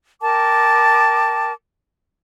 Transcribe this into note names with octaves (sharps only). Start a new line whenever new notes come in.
A#4 G5 A5 D6